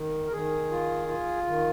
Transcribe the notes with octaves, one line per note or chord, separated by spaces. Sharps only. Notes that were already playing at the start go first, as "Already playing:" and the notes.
Already playing: D#3
A#4
D#3 G#4
F4
F4
D#3